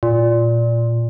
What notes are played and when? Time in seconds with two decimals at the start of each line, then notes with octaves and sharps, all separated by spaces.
0.03 A#2